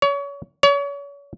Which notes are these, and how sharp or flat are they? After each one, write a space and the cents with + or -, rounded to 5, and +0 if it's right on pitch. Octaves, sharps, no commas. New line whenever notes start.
C#5 +30
C#5 +35